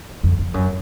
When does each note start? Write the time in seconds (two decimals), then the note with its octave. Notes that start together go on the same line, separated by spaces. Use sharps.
0.23 F2
0.39 F2
0.54 F#2